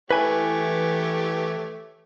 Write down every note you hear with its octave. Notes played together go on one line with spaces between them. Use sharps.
E3 A3 G4 B4 C#5 G#5